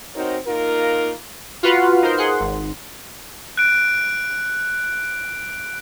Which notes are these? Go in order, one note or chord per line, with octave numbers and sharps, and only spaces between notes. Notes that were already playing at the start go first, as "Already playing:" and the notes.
C4 D#4 F#4 A#4 C5 C#5
A#3 D#4 F4 A#4
F4 F#4 B4 F5 F#5
D#4 A#4 C5
G#4 F#5 C6
G#1
F#6 D7